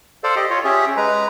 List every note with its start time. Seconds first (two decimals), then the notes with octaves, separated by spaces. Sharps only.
0.24 A4 C5 D5 F5
0.36 G4 D#5
0.50 F4 C#5
0.64 C#4 G4 G#4 E5
0.97 G#3 B4 A#5